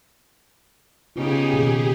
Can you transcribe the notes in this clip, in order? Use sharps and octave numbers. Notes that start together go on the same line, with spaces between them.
C#3 B3 D#4 F4 G4 G#4
B2 D#3 A#3